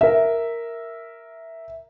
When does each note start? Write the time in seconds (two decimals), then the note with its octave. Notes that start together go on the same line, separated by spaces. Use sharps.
0.01 A#4 E5